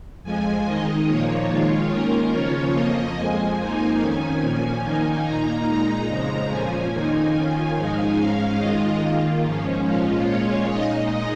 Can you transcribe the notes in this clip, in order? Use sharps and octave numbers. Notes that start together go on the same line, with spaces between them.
F2 F3 G#3 G#5
D#3 G#3 D#4 D#5
A#2 F3 A#3 C#5
D#3 G#3 F4
D#3 A#3 C#4 F4 A#4
C#3 F3 C#4 F4 C#5
F2 F3 A#3 D#5
F2 F3 G#3 G#5
F2 F3 A#3 D#4
F2 D#3 C#4 G#5
A#2 F3 C#4 G#5
D#3 A#3 D#4 G#5
A#2 A#3 D#4 A#5
A#2 G#3 D#4
F2 C#3 F3 G#3
A#2 F3 C#4 G#5
F2 D#3 A#3 D#4
D#3 C#4 F4
G#2 F3 G#3 D#4
G#2 G#3 C#4 F5
D#3 G#3 F4 D#5
D#3 A#3 F4
G#2 F3 C#4
A#2 F3 G#3 C#4 F4
A#2 G#3 C#4 F4 C#5
A#2 G#3 D#4 D#5